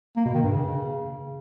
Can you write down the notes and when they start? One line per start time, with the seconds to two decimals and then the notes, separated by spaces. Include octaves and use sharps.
0.17 A#3
0.26 B2
0.34 D#3
0.43 G2
0.52 C#3